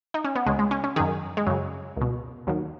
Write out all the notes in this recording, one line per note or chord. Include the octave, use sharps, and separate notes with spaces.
D#4
C#4
B3
C#2 C#3 G#3
G#3
C#4
C#4
F#2 D#3 G#4
G#3
F#2 C#3 F#3
C#2 B2
D#2 D#3 F#3